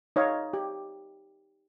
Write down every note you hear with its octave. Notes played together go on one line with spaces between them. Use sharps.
D#4 C#5 D#5 F5
G4